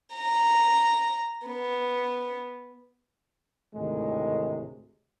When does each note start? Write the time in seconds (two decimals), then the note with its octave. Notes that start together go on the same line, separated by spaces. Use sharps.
0.15 A#5
1.47 B3
3.75 G#1 D2 A2 C3 D#3 G#3